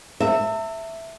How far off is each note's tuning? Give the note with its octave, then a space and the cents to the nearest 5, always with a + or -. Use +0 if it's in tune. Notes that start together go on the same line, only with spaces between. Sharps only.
E5 +0 A5 +45